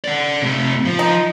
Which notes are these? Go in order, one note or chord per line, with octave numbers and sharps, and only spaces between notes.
D5 F#5
C3 A3
F3
D#4